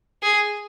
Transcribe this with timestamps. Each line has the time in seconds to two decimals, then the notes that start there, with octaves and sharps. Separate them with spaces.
0.23 G#4